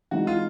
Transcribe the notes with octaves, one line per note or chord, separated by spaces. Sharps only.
E3 G#3 C4 D#4 F#4
F4